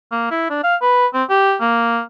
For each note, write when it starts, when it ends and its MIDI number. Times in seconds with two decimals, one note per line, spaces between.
0.12 0.26 58
0.31 0.50 64
0.50 0.61 62
0.63 0.75 77
0.82 1.06 71
1.14 1.24 60
1.30 1.55 67
1.61 2.00 58